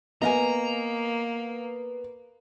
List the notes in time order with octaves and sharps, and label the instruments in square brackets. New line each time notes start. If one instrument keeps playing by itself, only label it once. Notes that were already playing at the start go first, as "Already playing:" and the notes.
[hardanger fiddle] A#3 [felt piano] B3 [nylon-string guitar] D#5 F5 G#5 [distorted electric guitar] A#5